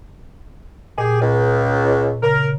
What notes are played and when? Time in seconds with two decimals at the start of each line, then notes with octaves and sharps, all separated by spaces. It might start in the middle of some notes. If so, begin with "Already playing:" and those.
0.98 A#2 G4 G#4
1.21 C#2
2.23 C#3 A#4